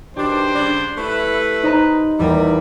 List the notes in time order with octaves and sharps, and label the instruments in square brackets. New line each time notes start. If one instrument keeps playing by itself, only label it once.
[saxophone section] B2 D#3 D4 [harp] G4 [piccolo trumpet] C5
[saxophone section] C#3 G3 D4
[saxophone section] A3 E4 [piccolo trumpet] B4
[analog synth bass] D#4 [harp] C5 D#5 A#5
[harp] E2 A#3 [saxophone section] G3